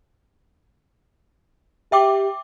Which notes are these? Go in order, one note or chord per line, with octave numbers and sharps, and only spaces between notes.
G4 E5 G5 D6